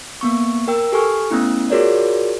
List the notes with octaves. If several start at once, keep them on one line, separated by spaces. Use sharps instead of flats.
A#3 B3 C#6
A#4 G5 E6
G4 A4 G#5 C#6 F6
A3 B3 C#4 E4
F4 F#4 G#4 A#4 C#5 D5